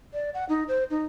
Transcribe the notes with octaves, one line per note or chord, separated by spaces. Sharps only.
D5
F#5
D#4
C5
D#4